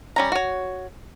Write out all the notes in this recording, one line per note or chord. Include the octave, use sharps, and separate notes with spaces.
G3 C#4 A#5
F#4 C#5